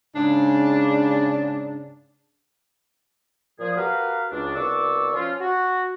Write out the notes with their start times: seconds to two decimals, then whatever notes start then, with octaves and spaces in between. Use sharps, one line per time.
0.15 G#2 C#3 D4
3.59 A#2 F3 G#4
3.77 F#4 G4 A#4 B4 F5
4.31 C#2 D4
4.56 C2 B2 D5 C#6 D6 E6
5.13 F3 C#4 F4
5.41 F#4